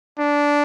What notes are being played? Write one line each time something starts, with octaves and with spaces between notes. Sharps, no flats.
D4